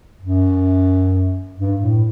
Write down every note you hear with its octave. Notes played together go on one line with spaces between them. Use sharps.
F#2
G2
A2